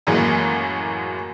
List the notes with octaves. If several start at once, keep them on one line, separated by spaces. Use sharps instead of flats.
F#2 A2 E3 F#3 G#3 A#3